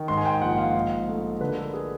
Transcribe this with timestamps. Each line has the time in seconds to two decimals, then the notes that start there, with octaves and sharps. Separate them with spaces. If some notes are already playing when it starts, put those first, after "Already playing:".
Already playing: D#3
0.08 G#2 C6
0.18 G#5
0.25 G5
0.42 A#1 F#5
0.58 F5
0.75 G#2
1.08 A3
1.41 D3 B4
1.51 A#4
1.57 A4
1.74 G#4